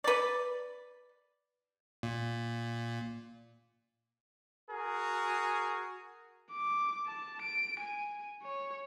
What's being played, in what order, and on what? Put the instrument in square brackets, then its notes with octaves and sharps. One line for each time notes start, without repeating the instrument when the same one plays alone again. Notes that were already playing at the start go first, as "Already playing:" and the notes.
[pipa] B4 D5
[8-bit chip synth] A#2
[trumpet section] F#4 G#4 A#4
[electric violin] D6
A5
D7
G#5
C#5